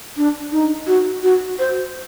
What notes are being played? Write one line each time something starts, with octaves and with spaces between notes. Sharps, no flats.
D4
D#4
F#4
F#4
C5